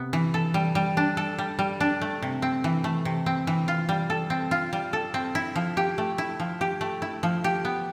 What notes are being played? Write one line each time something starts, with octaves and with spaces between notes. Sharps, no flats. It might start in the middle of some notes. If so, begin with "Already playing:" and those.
Already playing: C3 B3
E3
A4
G3
G3
D4
A4
G3
G3
D4
A3
C3
C4
E3
A3
C3
C4
E3
F4
G3
A4
C4
F4
G3
A4
C4
E4
F3
G4
A3
E4
F3
G4
A3
E4
F3
G4
B3